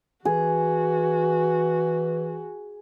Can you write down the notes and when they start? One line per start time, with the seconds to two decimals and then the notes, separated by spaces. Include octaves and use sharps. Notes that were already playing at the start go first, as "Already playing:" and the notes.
0.25 E3 F#4 G#4